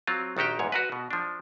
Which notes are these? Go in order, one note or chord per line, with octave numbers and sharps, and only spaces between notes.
F#3 C4 F4
A#1 D#3 F#4 G4 G5
E2 G#2 C#5
F#4 A#4 B4
B2
F3 D4